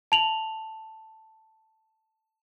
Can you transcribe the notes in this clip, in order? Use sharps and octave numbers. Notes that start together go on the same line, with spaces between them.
A5 F7 F#7